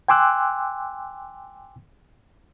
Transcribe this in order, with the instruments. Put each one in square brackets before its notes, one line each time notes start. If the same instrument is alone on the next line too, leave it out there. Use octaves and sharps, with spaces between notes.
[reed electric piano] G5 G#5 C6 D6 E6 F#6